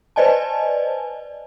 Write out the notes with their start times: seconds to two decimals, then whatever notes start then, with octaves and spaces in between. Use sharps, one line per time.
0.16 B4 C5 D5 D#5 G#5 A5